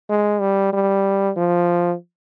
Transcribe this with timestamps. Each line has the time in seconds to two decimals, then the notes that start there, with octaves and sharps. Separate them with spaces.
0.09 G#3
0.40 G3
0.73 G3
1.36 F3